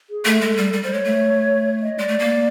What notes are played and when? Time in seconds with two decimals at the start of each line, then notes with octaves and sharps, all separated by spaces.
0.10 G#4
0.25 A3 A4
0.41 G#3
0.57 G3
0.73 G3
0.83 G3 C5
0.93 G#3 C#5
1.04 A3
1.82 D#5
1.98 G#3 D5
2.08 A3
2.19 A#3